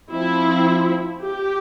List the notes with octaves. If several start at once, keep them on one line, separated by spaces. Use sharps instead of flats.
F3 C4 E4
G4